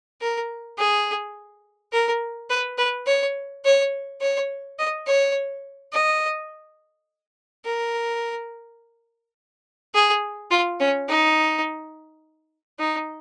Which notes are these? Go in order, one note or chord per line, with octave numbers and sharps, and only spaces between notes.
A#4
G#4
A#4
B4
B4
C#5
C#5
C#5
D#5
C#5
D#5
A#4
G#4
F4
C#4
D#4
D#4